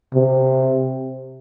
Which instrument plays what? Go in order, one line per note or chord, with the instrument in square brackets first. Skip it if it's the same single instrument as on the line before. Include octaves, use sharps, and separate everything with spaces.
[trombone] C3